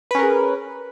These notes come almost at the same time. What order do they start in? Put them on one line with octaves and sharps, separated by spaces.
B4 C#4 A#4 G#4